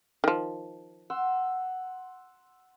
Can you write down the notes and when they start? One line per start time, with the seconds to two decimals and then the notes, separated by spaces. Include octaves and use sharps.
0.24 D#3 F3
1.10 F#5 C6 E6